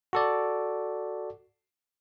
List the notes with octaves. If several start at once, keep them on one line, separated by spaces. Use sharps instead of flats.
F#4 A4 D5